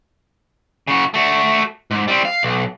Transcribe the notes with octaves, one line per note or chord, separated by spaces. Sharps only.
C#3 F#4
A3 F#4
G#2
G3 C4
F5
B1